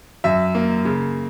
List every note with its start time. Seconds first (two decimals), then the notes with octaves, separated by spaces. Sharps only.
0.24 F#2 E5
0.55 A#3
0.85 C#3